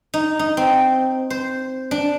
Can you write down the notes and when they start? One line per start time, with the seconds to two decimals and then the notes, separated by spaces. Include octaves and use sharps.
0.14 D#4
0.39 D#4
0.57 C4
1.30 C5
1.91 D4